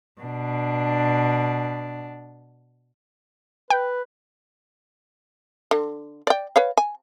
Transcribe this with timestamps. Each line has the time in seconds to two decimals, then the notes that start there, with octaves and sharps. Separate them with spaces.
0.21 B2 D4
3.70 B4 G5
5.71 D3
6.27 D5 G5
6.56 B4 C#5 F5
6.77 G#5